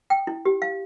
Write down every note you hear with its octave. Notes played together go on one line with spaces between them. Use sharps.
G5
E4
G4
F5